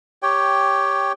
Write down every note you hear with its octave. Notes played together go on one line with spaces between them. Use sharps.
G4 C#5 G5